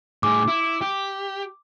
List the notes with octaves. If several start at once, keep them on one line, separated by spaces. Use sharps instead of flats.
A2 G#4 D6
E4
G4